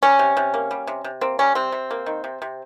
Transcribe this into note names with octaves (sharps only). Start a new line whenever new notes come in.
G3 C#4
C3
C3
A#3
G3
C3
C3
A#3 C4
G3 C#4
C3 C4
C3
A#3
D#3
C3
C3